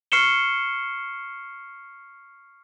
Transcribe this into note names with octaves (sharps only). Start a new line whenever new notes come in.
C#6 F6 C7 C#7 E7 G7